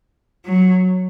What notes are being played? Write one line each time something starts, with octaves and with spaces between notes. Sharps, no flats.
F#3